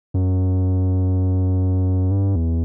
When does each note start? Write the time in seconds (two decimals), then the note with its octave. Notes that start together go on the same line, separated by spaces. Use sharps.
0.14 F#2
2.11 G2
2.36 E2